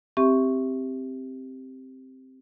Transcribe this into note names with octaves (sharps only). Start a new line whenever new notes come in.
C4 G4 E5 C#6